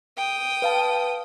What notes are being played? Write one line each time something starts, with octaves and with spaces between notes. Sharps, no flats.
G5 D#6
B4 F5 A5